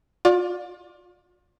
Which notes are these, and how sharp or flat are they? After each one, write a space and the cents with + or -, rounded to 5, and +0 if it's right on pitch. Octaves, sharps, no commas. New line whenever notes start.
F4 +35 D5 +0